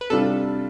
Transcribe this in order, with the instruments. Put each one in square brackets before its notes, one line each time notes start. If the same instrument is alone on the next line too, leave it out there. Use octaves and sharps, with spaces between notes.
[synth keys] B4
[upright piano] C3 G3 D4 F4 [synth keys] A4